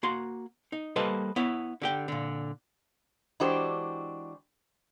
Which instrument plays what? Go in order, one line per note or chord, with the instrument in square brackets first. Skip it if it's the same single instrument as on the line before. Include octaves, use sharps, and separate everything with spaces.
[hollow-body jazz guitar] A#3 F#4 C6
D#4
G3 A#3 A4 B4 C5 D#5
B3 E4 C#5
D3 G4 G5
A#2 D3
[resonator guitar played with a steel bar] E3 G#3 D4 F#4 G4 C5